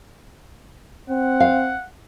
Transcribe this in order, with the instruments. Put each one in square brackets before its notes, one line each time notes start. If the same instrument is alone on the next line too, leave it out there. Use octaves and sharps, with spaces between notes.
[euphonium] C4 [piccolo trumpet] F#5
[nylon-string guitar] F5